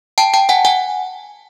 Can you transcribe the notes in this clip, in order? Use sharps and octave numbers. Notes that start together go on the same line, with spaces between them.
G5 A5
G5 A5
F#5 G#5
F#5 G#5